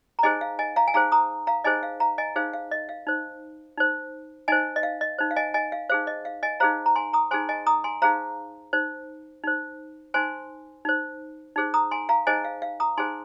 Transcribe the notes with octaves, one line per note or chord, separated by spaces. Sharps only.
A#5
D#4 G#4 C5 D#5 G#5
F5
D#5 G#5
F5 A#5
G#5
D#4 G#4 C5 F5 A#5
A#5 D#6
F5 A#5
D#4 G#4 C5 D#5 G#5
F5
F5 A#5
D#5 G#5
D#4 G#4 C5 F5
F5
D#5
F5
D#4 C5
D#4 C5
D#4 C5 D#5 G#5
D#5
F5
D#5
D#4 C5
F5
D#5 G#5
D#5 G#5
F5
D#4 G#4 C5 F5
D#5
F5
D#5 G#5
D#4 G#4 C5 F5 A#5
A#5
G#5 C6
A#5 D#6
D#4 G#4 C5 G#5 C6
D#5 G#5
A#5 D#6
G#5 C6
D#4 G#4 C5 F5 A#5
D#4 C5
D#4 C5
D#4 C5 G#5 C6
D#4 C5
D#4 G#4 C5
A#5 D#6
G#5 C6
F5 A#5
D#4 G#4 C5 D#5 G#5
F5
F5
A#5 D#6
D#4 G#4 C5 G#5 C6